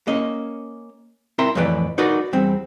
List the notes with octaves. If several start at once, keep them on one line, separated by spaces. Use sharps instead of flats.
A#3 C#4 D#5
C4 E4 A#4 E5 A#5 C6
F2 A2 E3 B4 D5
D#4 F#4 A#4 B4 D5
E2 G3 C4